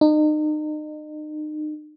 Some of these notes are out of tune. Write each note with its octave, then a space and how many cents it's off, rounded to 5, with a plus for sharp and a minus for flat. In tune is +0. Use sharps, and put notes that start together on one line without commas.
D#4 -35